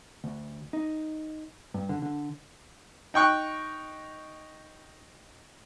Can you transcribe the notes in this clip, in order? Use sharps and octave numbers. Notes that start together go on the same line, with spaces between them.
D2
D#4
G2
D3
D3
D#4 G5 C#6 F#6